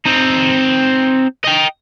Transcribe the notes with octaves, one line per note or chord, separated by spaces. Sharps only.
C4 D#4
D#5 G5